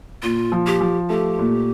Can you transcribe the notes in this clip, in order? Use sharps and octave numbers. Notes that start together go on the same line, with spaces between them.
A#2 F4
F3
G4
F3
A3 G4
A#2